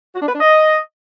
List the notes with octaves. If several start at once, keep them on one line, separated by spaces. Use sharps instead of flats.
F#4
D4
B4
D4
D#5